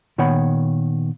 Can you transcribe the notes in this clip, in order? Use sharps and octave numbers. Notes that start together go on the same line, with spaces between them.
A#2 D#3 B3 C#5 F#5 B5